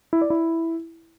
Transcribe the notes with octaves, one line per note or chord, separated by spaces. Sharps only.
E4
D5
E4